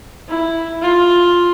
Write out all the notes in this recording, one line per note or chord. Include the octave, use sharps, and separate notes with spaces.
E4
F4